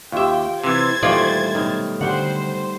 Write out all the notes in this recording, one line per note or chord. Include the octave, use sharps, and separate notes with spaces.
D#2 F4 G4 E5 G5
C3 E3 C5 G#6 A6
A#2 D#3 E3 G3 A3 F4 D5
B1 D#3
D3 G3 C5 F#5